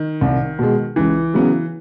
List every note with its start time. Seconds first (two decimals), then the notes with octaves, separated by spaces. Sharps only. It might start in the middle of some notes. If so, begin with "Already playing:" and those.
Already playing: D#3
0.21 C2
0.59 B2 G#3
0.96 C#2 E3
1.34 C#3 F#3 B3